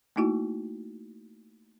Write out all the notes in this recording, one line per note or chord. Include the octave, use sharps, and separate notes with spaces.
A3 A#3 D#4 E4 F#4